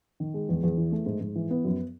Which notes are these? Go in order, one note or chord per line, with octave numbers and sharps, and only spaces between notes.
D#3
G#3
E2
E2
E3
A3
G#2
G#2
E3
B3
F#2